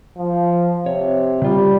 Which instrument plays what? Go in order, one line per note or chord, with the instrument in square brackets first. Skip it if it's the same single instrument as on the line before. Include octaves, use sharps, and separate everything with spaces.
[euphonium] F3
[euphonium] C3 [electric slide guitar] C#5
[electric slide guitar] C#3 F4 [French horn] G3